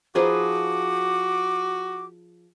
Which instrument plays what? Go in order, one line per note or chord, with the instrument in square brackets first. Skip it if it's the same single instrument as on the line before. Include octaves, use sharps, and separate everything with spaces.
[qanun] F3 G#4 B4 [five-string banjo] D#4 C5 [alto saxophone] F#4 [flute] D6